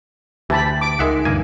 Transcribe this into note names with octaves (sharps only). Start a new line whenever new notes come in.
D2 E3 G4 A5 B5
D6
C#2 G#3 D#4 A#4 E5 F#5
E1 D2 G2 A#3 G#5